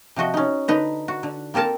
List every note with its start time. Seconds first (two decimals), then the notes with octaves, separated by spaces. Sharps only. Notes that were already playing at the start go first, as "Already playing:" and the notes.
0.16 C3 F3 F#4 D#5
0.34 C#4 D#4
0.68 D3 D#4 B4
1.08 F#4
1.23 D3
1.54 A#3 C4 A4 A#4 A5